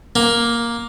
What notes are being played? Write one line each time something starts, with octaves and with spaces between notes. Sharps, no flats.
A#3